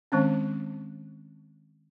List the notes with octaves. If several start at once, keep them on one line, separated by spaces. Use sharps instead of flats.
D#3 G#3 C4 C#4